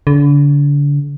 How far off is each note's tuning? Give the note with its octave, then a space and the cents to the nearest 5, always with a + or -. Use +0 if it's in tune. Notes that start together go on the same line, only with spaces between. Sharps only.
D3 -35